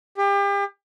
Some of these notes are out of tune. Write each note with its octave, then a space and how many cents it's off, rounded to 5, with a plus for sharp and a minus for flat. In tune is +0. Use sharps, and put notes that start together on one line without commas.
G4 +35